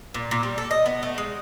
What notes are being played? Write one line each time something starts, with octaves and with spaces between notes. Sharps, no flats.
A#2
A#2
G3
A4
D#5
B3
A3
G#3